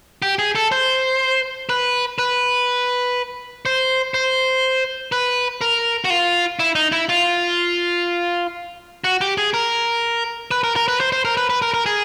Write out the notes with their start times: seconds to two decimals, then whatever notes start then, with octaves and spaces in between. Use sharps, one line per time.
0.22 G4
0.39 G#4
0.55 A4
0.72 C5
1.69 B4
2.19 B4
3.66 C5
4.14 C5
5.12 B4
5.61 A#4
6.04 F#4
6.10 F4
6.59 E4
6.75 D#4
6.92 E4
7.09 F4
9.04 F#4
9.21 G4
9.38 G#4
9.54 A#4
10.51 B4
10.64 A#4
10.76 A#4
10.88 B4
11.00 C5
11.12 C5
11.25 A#4
11.37 B4
11.50 B4
11.62 A#4
11.74 A#4
11.86 G#4